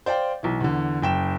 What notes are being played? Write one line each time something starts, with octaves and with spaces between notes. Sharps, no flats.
C5 D5 F5 G5
B1 E3
E2 D3
F#1 G5 E7